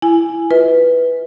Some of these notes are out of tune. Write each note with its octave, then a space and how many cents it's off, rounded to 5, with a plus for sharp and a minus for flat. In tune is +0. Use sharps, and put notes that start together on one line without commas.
E4 +15 G#5 +0
F4 +20 B4 +0 E5 -40